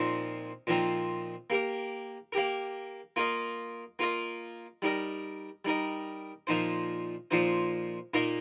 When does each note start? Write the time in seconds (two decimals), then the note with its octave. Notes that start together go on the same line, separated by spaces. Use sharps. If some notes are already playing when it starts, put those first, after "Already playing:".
Already playing: A#2 F3 C4 D#4
0.67 A#2 F3 C4 D#4
1.50 A#3 G4 A#4
2.32 A#3 G4 A#4
3.16 A#3 F4 A#4 D#5
3.99 A#3 F4 A#4 D#5
4.82 G3 D#4 A#4 D#5
5.65 G3 D#4 A#4 D#5
6.47 A#2 F3 D#4 C5
7.31 A#2 F3 D#4 C5
8.14 A#2 A#3 D#4 A#4 D#5